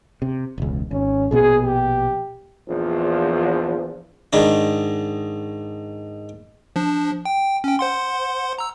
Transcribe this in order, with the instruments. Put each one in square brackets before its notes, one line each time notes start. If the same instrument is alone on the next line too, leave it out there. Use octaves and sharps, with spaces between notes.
[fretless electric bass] C3
E1 C#2
[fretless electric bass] G#1 [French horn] C#4
[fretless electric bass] A#1 B2 B3 [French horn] G#4
[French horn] G4
[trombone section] A#1 E2 F3
[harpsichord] G#2 D#3 D4
[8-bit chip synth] F3 D4
G5
C#4 G5
C5 F#5 C6
A#5 E6